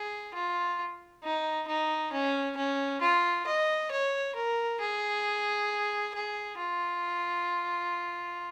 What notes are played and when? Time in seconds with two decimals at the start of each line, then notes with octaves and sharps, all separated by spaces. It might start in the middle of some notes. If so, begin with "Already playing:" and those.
Already playing: G#4
0.34 F4
1.23 D#4
1.68 D#4
2.12 C#4
2.57 C#4
3.02 F4
3.47 D#5
3.91 C#5
4.35 A#4
4.80 G#4
6.14 G#4
6.58 F4